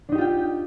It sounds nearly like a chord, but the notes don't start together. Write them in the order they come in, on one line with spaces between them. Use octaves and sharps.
D4 D#4 G4 F4 G5